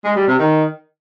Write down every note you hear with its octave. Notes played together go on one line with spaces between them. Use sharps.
G#3
G3
C3
D#3